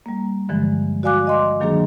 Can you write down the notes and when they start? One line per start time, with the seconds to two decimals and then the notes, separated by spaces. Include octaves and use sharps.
0.06 G3 A#3
0.49 G2 D3 E3 F3 G#3
1.03 F#4 D5 F5 G#5 D6 F#6
1.27 D#5 C6 D6
1.60 D#3 F#3 A#3 D4 G#4